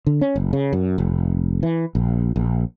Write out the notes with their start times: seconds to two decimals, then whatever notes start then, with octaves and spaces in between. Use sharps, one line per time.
0.07 D3
0.21 C#4
0.36 F#1
0.53 C#3
0.73 F#2
0.98 F1
1.63 E3
1.95 A#1
2.36 A#1